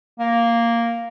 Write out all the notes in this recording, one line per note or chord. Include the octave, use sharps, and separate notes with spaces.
A#3